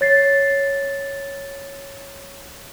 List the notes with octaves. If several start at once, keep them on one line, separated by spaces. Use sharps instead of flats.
C#5 A6 C7